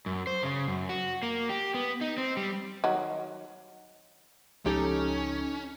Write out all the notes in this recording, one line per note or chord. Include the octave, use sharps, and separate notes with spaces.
F#2
C5
C#3
F#2
F#4
A#3
G4
B3
D#4
C4
G3
D#3 F#3
C#2 F3 C#4 D#4 G4 A4